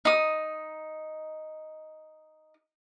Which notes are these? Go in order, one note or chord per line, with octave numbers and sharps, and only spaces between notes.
D#4 D#6